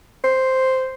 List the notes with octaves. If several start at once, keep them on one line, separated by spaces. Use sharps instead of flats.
C5